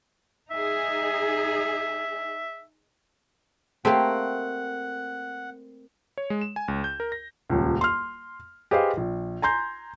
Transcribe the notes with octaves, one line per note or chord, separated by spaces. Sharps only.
D#4 G#4 E5
A3 A#3 C4 G4 F#5 G5
C#5
G#3
E7
G#5
C#2
G6
A#4
A#6
D#1 C#2
C6 F6
G4 G#4 B4 C5 D#5 F5
A#1
G#5 A#5 C6 G6